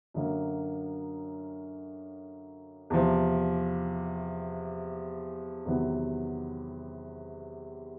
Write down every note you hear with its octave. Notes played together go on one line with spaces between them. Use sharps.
F#2 D3 F#3 A#3
E2 C3 F3
E2 C3 D#3 F#3 B3